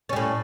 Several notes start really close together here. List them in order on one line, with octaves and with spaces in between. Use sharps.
C#4 G3 A2